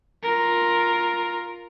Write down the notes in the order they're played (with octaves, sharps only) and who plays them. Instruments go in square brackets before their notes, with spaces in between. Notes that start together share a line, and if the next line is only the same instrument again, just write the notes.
[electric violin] F4 A#4